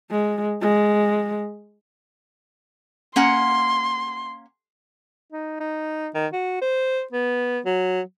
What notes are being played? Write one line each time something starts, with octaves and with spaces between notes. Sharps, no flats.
G#3
G#3
A#3 C#4 F#5 C6
D#4
D#4
D#3
F#4
C5
B3
F#3